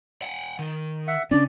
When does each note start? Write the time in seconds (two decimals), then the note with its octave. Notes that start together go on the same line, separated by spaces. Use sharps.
0.22 F#5 G5
0.59 D#3
1.08 E5 F#5
1.31 C#3 C#4 D4 D5